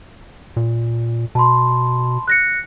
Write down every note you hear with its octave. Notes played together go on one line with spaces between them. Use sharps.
A#2
B2 A5 B5 C6
F#6 A#6 C#7